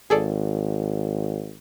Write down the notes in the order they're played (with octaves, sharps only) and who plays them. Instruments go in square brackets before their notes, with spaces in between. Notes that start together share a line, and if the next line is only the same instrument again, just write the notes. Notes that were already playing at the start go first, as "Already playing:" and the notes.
[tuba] G#1 [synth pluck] G#4 A4 D5